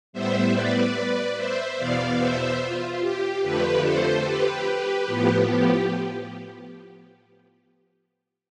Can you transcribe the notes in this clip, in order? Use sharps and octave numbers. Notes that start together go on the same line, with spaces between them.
A2 G3 B3 C5 E5
B4 D5
C5 E5
E2 B2 B3 D5 F5
C5 E5
F4
G4
F2 D3 F3 A3 G4 B4
A4 C5
G4 B4
A2 F3 B3
G4